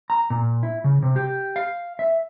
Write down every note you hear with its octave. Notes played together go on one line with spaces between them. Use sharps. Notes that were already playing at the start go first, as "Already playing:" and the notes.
A#5
A#2
E4
C#3
C3
G4
F5
E5